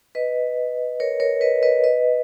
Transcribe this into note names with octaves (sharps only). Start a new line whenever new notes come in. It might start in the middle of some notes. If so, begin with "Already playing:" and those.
B4 D#5
A#4 C#5
A#4 C#5
B4 D#5
B4 D#5
B4 D#5